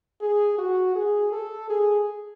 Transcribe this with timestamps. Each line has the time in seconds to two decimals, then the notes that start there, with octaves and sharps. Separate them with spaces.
0.21 G#4
0.58 F#4
0.95 G#4
1.32 A4
1.70 G#4